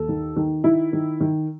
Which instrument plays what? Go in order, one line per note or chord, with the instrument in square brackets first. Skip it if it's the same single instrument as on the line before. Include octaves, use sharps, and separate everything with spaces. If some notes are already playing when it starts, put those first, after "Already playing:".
Already playing: [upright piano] D#2 A4
D#3
D#3
D#3 E4
D#3
D#3